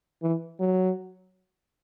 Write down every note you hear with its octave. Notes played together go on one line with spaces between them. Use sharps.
E3
F#3